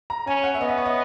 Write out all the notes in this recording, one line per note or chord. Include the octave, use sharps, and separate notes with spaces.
A#5
C#4 G#5
F#5
E5
B3 D#5
E5
C#5
D#5